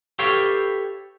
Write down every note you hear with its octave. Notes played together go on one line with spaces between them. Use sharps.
G4 A4 B4 C#5 F5 G5